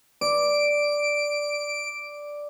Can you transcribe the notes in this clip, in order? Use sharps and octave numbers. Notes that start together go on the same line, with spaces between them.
D5 D7